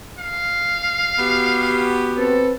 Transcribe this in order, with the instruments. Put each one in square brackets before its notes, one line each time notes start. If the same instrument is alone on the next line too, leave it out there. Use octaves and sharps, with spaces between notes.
[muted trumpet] F5
[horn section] B3 F#4 G4
[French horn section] C4 B4 [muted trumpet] A4